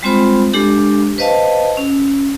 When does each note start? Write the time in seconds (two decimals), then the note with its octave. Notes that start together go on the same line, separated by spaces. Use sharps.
0.03 G3 G#3 C4 F4 C5 B5
0.53 G#3 D4 G4 A4
1.18 B4 C5 D#5 F5 A5
1.77 C#4